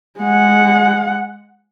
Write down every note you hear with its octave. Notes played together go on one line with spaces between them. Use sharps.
G#3 F#5